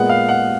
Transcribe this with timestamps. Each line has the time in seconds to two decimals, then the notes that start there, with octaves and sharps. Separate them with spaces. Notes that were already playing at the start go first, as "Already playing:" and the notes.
Already playing: A#2 G#3 B3 F#5
0.09 F5
0.29 F#5